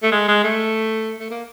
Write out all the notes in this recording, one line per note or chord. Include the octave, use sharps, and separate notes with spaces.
A3
G#3
G#3
A3
A3
A#3